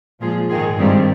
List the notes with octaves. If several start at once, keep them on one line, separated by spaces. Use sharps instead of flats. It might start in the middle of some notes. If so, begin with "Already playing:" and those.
A#2 F3 G#3 F4 G#4
G#2 D#3 G#3 F4 G#4
G2 D#3 G3 G#3 C4